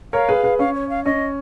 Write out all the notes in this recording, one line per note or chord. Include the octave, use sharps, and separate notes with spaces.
A#4 C#5 F5
G#4 B4
G#4 B4
C#4 F5
C#5
F5
C#4 D#5